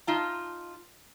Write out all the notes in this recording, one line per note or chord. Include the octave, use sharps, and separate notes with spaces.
D#4 F4 A5